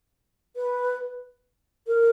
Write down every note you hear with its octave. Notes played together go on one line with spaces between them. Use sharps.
B4
A#4